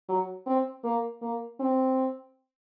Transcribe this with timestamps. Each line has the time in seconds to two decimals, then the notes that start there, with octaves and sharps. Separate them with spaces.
0.09 F#3
0.47 C4
0.84 A#3
1.22 A#3
1.60 C4